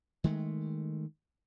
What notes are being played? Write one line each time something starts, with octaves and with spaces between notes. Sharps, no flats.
D#3 G#3 A3